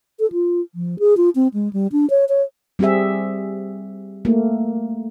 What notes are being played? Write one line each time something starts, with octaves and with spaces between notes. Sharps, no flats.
A4
F4
F3
G#4
F4
C4
G#3
G3
D4
C#5
C#5
G3 C4 G4 G#4 E5
A3 A#3